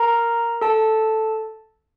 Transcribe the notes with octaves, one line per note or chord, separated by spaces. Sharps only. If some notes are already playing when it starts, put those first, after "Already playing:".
Already playing: A#4 A#5
A4 A5